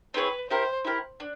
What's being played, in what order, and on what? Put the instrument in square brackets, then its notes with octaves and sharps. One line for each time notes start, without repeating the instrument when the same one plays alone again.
[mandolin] C4 E4 G#4 C#5 [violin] B4
[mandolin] E4 G4 A#4 [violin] C5
[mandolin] E4 G4 A#4
D4